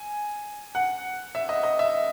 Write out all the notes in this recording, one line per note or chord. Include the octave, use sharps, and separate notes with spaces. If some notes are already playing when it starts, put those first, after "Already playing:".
Already playing: G#5
F#5
E5
D#5
D#5
E5